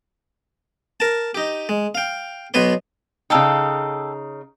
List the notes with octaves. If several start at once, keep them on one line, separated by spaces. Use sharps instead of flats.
A#4 A5
D#4 G4
G#3
F5 G5
B1 B2 B3 B4 C#5 C6
C#3 D#4 A4 F5 G5